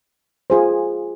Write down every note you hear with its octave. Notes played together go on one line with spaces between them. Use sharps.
F4 G#4 C5